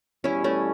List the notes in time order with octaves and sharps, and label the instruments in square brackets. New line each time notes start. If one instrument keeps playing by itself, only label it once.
[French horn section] E2 B2 G3 [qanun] C#4 E4
[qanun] A3 C#4